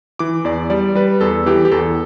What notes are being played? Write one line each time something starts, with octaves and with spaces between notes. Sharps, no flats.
E3 D6
E2 D5
G3 D5
G3 B4
E2 A4
E3 G4
G4
E2 A4